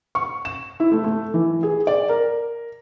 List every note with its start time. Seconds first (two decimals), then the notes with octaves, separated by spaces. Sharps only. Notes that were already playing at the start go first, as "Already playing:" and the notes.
0.15 C#6
0.45 E7
0.80 E4
0.92 A3
1.04 A3
1.34 E3
1.63 G#4
1.87 D5
2.09 A#4